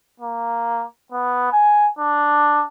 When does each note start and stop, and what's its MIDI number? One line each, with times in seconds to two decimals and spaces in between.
0.20 0.84 58
1.12 1.49 59
1.52 1.89 80
1.99 2.63 62